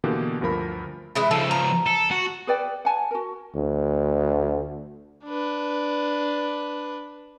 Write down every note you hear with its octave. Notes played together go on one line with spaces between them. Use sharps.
B2 D3 E3 A#3 G4
D2 G2 F3 A#4 B5
E3 G#3 E4
C#3 F3 A4
A#5
A4
F#4
G#4 B4 D5 G5
F#5 G#5 A5
F#4 A#4
D2
D4 B4